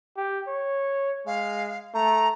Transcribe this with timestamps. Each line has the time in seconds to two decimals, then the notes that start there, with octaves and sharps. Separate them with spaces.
0.17 G4
0.47 C#5
1.27 G#3 F5
1.94 A3 A#5